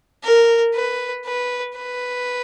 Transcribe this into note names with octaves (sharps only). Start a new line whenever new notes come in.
A#4
B4
B4
B4